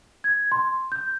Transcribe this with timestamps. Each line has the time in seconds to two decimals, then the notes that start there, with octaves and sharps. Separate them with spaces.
0.24 G#6
0.52 C6
0.92 G6